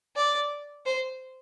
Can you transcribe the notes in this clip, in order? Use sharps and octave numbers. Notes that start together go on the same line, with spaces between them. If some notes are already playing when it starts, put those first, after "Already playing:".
D5
C5